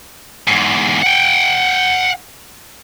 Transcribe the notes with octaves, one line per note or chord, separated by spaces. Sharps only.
E2 G#2
F#5 G5